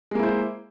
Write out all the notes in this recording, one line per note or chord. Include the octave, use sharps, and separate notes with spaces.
G#3 A#3 E4 C5